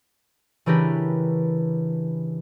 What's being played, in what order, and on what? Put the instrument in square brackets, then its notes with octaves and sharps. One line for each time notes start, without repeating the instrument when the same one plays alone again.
[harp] C#3 E3 D4 G4 A#4 B4